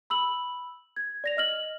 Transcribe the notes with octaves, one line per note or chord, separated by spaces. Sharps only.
B5 E6 F#7
G#6
D5 A#6 F7
D#5 F6 F#7